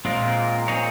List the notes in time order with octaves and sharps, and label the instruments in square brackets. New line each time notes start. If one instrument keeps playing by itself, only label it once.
[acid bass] A#2 [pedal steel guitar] G#3 C4 F4 A#4
[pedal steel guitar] C4 D#4 G#4 C#5